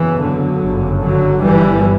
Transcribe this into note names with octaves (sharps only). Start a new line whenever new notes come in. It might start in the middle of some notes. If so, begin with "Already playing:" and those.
Already playing: F#1 E2 C#3 E3
D3 F#3
G1 F#2 C#3
D3 F#3
G1 G2 E3 G3